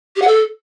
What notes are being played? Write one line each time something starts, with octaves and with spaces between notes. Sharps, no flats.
G4
F#5
A4